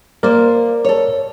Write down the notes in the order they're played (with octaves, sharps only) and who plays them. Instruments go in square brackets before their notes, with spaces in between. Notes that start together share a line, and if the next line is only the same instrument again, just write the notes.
[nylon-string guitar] A#3 C5 [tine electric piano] A#4 D5
[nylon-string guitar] A4 C#5